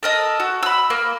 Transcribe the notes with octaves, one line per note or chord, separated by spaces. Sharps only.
A4 A#4 D#5
F#4
B5 E6
A#3